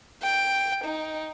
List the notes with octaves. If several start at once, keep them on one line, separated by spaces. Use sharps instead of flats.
G5
D#4